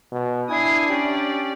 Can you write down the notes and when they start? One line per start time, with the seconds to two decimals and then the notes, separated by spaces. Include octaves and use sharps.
0.12 B2
0.50 D4 E4 G#5 D#6 C7
0.89 C#4 G4 D5